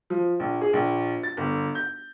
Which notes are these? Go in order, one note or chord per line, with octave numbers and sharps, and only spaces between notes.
F3
A#1
G#4
A#1
A6
G1
G6